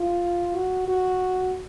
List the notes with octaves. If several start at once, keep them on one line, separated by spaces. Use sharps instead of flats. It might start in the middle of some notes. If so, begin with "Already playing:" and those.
Already playing: F4
F#4
F#4